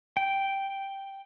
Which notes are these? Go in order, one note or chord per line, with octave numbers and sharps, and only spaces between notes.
G5